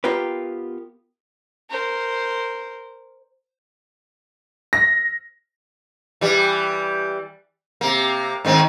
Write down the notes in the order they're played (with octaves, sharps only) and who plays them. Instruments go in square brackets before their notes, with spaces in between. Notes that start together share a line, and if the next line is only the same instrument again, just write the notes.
[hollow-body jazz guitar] B3 F4 G4 A#4 B4
[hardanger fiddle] A#4 C5
[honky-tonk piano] A#6
[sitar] E3 G3
C3 A#3
G#2 D#3 C4